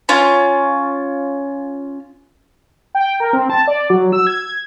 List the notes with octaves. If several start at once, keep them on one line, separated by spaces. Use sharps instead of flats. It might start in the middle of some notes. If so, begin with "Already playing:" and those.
C#4 F4
G5
A#4
C4
A5
D5
F#3
E6
G#6